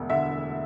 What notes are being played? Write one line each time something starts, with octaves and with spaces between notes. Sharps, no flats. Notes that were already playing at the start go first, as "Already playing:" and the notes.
Already playing: E1 D2
D3 E5